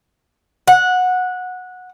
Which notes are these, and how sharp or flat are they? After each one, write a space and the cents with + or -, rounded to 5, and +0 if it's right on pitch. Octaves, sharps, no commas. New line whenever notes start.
F#5 -15